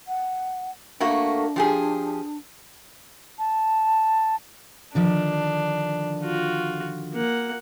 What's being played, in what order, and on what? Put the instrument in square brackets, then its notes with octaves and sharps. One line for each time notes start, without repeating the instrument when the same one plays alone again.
[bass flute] F#5
[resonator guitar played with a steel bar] A3 A#3 F#4 [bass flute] D4
[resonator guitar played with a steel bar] F3 G4 G#4
[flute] A5
[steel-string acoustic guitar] D3 D#3 F3 [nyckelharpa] D4
[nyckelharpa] F4 F#4
A#3 F#5